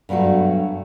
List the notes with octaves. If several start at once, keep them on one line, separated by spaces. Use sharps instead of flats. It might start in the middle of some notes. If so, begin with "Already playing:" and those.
G2 B2 F#3 A3 F#4